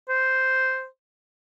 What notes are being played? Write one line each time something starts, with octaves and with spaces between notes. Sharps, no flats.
C5